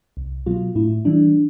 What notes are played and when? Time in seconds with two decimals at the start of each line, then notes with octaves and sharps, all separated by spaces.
0.17 C2
0.46 B2 F#3 F4
0.75 A2 E4
1.05 E3 G3 D4